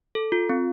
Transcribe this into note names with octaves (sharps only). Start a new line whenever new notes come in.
A4
F4
C4